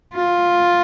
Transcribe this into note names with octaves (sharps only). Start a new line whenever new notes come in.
F4